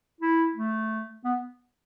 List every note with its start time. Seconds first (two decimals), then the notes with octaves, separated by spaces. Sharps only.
0.21 E4
0.55 A3
1.25 B3